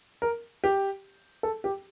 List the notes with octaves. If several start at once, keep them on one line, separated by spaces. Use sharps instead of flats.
A#4
G4
A4
G4